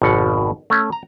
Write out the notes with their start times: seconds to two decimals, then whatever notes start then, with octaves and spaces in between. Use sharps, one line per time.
0.02 G#1 F2 B2 F#5
0.70 A3 C#4
0.92 A#5